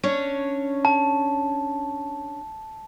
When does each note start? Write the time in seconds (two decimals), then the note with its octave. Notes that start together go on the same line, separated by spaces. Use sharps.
0.03 C#4 D4 C#5
0.85 A5